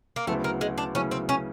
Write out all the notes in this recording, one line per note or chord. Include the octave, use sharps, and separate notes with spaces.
A#3
D2 C#3 F#3 A3 B3 E4
A#3
G#3
D4
D2 C#3 F#3 B3 C#4 E4
C4
C#4